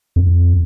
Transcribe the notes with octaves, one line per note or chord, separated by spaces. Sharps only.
F2